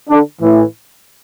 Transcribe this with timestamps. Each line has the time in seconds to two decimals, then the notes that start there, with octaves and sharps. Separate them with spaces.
0.10 D3 D4
0.41 A2 E3